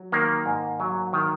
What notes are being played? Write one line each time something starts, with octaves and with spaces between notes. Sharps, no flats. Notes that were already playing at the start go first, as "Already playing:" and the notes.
Already playing: F#3
D#3 A#3
G#2
F#3
D#3